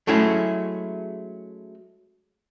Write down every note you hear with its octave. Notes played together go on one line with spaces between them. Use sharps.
F#3 G#3 A3 C#4 E4 G#4